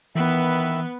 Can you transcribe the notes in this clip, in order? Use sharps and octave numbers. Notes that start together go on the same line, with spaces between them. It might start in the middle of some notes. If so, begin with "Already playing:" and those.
D#3 E3 B3 B4 E5